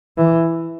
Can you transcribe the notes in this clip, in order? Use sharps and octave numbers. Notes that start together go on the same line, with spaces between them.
E3